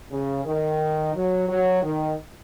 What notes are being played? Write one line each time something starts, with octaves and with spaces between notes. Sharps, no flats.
C#3
D#3
F#3
F#3
D#3